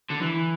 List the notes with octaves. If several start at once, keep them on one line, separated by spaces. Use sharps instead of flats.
D3
E3